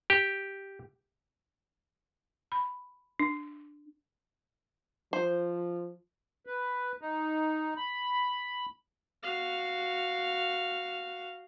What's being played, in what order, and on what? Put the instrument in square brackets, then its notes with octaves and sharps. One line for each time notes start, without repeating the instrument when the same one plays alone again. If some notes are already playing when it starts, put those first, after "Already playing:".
[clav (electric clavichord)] G4
[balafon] B5
D4
[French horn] F3 [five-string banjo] C5
[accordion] B4
D#4
B5
[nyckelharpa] F#4 F5